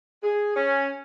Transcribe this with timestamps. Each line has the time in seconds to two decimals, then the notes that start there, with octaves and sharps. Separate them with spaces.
0.23 G#4
0.56 C#4